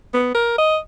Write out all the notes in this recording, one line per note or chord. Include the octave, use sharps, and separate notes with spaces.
B3
A#4
D#5